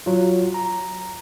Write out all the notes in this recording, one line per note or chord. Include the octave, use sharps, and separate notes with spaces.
F#3 F4
A#5